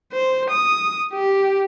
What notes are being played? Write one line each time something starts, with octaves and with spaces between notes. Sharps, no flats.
C5
D#6
G4